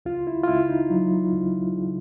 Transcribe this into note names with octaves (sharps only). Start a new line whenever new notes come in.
C#2 F4
E4
F4
C#2 E4
D#4
F#3
C#2
C#3